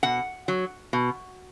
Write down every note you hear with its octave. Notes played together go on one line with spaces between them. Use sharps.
B2 F#5
F#3
B2